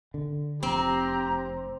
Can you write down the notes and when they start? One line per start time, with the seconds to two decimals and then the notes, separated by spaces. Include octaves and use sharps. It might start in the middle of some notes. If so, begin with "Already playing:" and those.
0.14 D3
0.63 F1 C4 G4 A#5